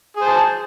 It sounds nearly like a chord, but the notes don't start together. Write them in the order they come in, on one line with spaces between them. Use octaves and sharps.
G#4 C5 A5